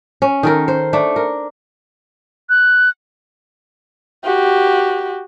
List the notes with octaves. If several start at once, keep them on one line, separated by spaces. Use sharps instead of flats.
C#4
D#3 A4 A#4
C5
A3 D4
A#4
F#6
F#4 G4